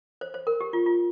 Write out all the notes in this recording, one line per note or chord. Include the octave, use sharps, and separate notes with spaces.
C5
C5
A#4
G4
F4
F4